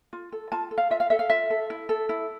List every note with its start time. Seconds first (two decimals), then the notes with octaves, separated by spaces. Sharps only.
0.13 F4
0.32 A4
0.52 F4 A5
0.71 A4
0.78 F5
0.90 F4 E5
1.00 F5
1.10 A4 E5
1.19 F5
1.30 F4 E5
1.50 A4
1.70 E4
1.89 A4
2.09 E4